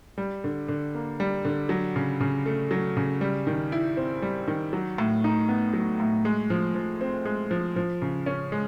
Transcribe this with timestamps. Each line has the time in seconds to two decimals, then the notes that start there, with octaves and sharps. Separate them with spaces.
0.18 G3
0.44 D3
0.68 D3
0.95 A#3
1.20 G3
1.45 D3
1.69 F#3
1.96 C#3
2.20 C#3
2.46 A3
2.71 F#3
2.97 C#3
3.21 G3
3.47 D#3
3.72 E4
3.97 C4
4.22 G3
4.48 D#3
4.73 F#3
4.98 A2
5.24 D#4
5.49 B3
5.73 F#3
6.00 A2
6.25 G#3
6.50 F3
6.75 F3
7.01 C4
7.25 G#3
7.51 F3
7.76 F3
8.02 C#3
8.26 C#4
8.52 G#3